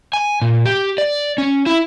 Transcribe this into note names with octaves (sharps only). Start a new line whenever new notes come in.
G#5
A#2
G4
D5
C#4
E4